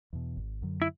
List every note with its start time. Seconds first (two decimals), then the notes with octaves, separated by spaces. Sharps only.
0.13 E2 B2
0.37 G#1
0.62 F#2 D3 F#3
0.82 E4